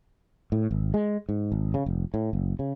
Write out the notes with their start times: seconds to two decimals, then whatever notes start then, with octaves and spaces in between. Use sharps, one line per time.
0.52 A2
0.71 G#1
0.94 G#3
1.29 G#2
1.52 G#1
1.74 C#3
1.86 F1
2.14 A2
2.33 F#1
2.59 C#3